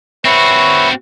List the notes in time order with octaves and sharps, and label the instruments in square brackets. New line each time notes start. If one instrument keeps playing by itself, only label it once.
[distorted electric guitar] C4 F#4 [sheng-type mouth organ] B4 C#5 E5